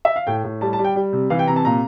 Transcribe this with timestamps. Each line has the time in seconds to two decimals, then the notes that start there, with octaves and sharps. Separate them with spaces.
0.05 E5
0.16 F5
0.27 A2 G5
0.44 A2
0.61 G3 A5
0.73 A5
0.79 G3
0.84 G5
0.96 G3
1.13 C3
1.30 E3 F5
1.39 G5
1.47 C3 A#5
1.56 A5
1.65 A#2 A#5